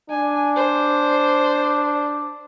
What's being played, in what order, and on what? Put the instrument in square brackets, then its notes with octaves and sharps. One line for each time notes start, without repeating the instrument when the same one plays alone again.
[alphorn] D4 [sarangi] G#5
[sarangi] C5